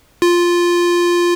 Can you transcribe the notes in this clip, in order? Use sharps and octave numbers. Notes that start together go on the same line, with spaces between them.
F4